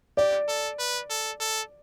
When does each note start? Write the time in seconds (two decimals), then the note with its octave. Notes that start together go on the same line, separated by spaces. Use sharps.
0.17 G4 D5
0.48 A4
0.79 B4
1.10 A4
1.40 A4